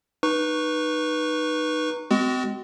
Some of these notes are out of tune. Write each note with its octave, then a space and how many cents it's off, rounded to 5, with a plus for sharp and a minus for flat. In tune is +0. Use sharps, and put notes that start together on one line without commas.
D#4 -15 B4 -15 C#6 +0
G#3 +0 C4 -40 F#4 +25